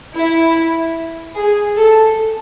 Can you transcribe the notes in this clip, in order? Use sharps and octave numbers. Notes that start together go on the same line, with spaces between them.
E4
G#4
A4